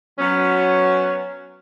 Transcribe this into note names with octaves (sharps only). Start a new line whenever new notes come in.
F#3 B3 C#4